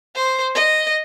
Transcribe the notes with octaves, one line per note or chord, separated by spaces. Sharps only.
C5
D#5